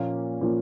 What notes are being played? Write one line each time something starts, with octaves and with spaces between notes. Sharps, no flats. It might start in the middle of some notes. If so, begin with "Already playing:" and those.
Already playing: A#2 F3 A#3 C#4
A#2 F3 A#3 C#4